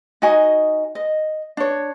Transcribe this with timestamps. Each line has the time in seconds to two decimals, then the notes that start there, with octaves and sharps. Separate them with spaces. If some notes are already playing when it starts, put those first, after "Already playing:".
0.22 D#4 F#4 D#5 G#5
0.95 D#5
1.57 D4 C#5